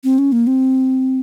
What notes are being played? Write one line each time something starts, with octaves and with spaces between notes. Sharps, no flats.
C4
C#4
A#3
C4